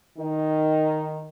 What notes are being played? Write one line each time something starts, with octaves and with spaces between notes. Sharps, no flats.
D#3